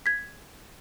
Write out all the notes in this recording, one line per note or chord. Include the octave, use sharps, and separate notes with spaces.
G#6 B6